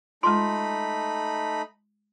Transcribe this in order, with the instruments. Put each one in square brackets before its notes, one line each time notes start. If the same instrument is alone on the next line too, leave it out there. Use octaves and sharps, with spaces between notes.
[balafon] G#3 F4 [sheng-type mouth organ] A3 D#4 B5 [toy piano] C6